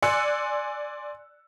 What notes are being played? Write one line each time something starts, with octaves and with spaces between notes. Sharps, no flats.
D5 G#5 C6 E6 F#6 C#7